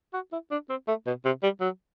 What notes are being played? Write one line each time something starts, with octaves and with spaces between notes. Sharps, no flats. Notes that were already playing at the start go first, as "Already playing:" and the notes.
F#4
E4
D4
C4
A3
B2
C3
G3
F#3